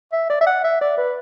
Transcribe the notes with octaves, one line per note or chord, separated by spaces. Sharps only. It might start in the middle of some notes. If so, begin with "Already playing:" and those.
E5
D5
E5
F#5
E5
D5
B4